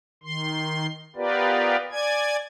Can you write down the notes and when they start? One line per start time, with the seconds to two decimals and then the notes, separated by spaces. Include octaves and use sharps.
0.23 D#3 C6
1.16 B3 F4 G4 A#4 B4 D5
1.91 D5 G#5 G#6